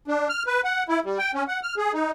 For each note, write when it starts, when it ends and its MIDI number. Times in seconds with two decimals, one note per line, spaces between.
0.08 0.28 62
0.29 0.43 89
0.47 0.61 71
0.64 0.83 78
0.89 1.00 64
1.05 1.18 55
1.18 1.31 79
1.34 1.43 61
1.48 1.60 78
1.63 1.75 89
1.77 1.92 68
1.94 2.11 63